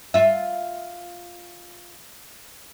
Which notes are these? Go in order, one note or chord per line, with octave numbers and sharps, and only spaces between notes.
F4 E5